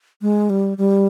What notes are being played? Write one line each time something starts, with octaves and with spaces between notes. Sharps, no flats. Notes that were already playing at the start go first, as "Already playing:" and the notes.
G#3
G3
G3